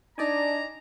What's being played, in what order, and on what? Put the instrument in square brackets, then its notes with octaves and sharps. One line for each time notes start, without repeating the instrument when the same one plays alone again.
[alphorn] D4 [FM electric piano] D#4 D5 G#5 [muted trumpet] A#5